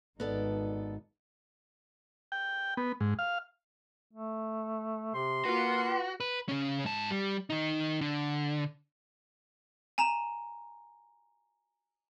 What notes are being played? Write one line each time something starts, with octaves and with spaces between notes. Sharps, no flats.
G#1 B3 D#4 A4 D5
G5
B3
G#2
F5
A3
C3 C6
A#3 F4 F#4 B4
B4
C#3 C#4
G#2 A5
G3
D#3 D#4
D3
G#5 A#5 E7